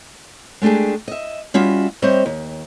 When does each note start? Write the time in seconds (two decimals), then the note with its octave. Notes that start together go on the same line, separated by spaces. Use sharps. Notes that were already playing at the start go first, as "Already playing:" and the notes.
0.62 G#3 A3 D4 G4 G#4
1.08 D#5 E5
1.54 G3 C#4 F4 F#4 E5
2.02 G3 C4 C5 C#5 D#5 E5
2.26 D#2